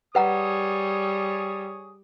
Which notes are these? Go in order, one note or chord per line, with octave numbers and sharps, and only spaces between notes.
G3 G#4 B4 C#5 F#5 A#5 D#6